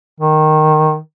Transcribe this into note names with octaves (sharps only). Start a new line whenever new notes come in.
D#3